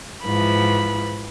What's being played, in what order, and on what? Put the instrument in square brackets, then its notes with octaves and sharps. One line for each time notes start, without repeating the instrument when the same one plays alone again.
[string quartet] G#2 E3 F3 B5